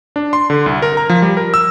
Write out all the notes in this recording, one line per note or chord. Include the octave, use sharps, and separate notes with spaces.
D4
C6
D3
C2
A#4
A#5
F3
G3
A#4
E6